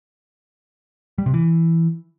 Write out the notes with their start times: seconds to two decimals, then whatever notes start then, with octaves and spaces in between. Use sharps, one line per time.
1.18 G3
1.26 C3
1.34 E3